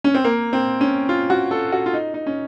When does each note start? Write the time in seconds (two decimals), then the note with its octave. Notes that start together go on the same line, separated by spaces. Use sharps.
0.04 C#4
0.14 C4
0.24 A#3
0.53 C4
0.81 C#4
1.09 F4
1.30 F#4
1.51 A4
1.72 F#4
1.86 F4
1.94 D#4
2.14 D#4
2.26 C#4